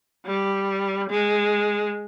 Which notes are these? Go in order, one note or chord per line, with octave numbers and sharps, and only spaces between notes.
G3
G#3